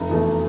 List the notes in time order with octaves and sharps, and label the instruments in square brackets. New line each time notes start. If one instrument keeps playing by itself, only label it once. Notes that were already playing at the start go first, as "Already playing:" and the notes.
Already playing: [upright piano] F1
E2 B2 A3